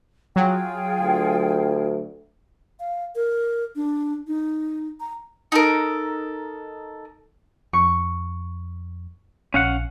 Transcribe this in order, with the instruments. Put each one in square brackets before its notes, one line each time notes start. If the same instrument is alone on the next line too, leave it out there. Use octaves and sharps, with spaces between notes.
[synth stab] F#3 [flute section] F4 G#4 G5
[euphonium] D2
[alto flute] F5
A#4
D4
D#4
A#5
[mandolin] D#4 A4 A#4
[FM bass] F2 [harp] C#6
[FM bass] A#1 [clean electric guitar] C#4 F5 F#5